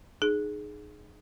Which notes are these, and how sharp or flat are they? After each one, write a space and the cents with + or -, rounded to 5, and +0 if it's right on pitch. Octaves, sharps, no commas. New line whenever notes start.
D#4 -30 G#4 +15